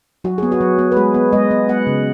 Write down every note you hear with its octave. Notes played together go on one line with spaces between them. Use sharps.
F#3 F#4
B3 G#4
F#4
F#3
B3
B4
G#3 G#4
B3
G#3 D#5
B3
B3 F#5
C#3